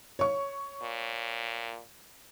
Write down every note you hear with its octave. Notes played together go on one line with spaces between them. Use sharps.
C#5 C#6
A#2